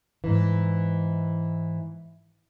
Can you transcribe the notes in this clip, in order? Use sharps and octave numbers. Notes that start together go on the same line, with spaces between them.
G#2 E3